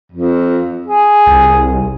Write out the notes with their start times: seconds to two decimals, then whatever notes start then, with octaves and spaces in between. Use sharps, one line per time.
0.12 F2
0.87 G#4
1.27 C2